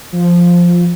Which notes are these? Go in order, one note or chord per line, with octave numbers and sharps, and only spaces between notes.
F3